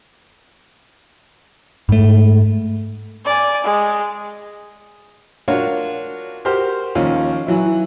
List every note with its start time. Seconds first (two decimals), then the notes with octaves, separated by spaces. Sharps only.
1.89 G#2 A3
3.25 D5 G#5
3.64 G#3
5.48 D4 F4 F#4 A#4 C#5 F5
6.45 F#4 G4 A#4 C5 C6 F6
6.95 D#2 F3 C#4 F5
7.47 E3 F#3 E4